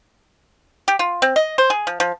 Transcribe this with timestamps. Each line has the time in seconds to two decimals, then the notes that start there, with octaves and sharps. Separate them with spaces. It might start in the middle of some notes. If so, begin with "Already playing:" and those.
0.88 G4
0.99 F4
1.22 C4
1.36 D#5
1.58 C5
1.70 G#4
1.87 F3
2.00 F3